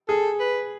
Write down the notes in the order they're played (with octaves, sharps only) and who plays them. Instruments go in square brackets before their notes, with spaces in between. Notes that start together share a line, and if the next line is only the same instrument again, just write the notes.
[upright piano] G#4 [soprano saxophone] A4
[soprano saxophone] B4